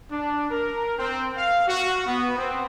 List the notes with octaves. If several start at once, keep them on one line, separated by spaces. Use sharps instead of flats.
D4
A#4
C4
F5
F#4
B3
C4